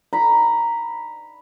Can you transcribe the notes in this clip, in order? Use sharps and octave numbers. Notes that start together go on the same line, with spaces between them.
A#5 B5